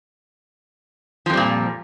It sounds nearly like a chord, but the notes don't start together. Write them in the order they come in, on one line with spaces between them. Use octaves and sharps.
F3 F2 G3 A#2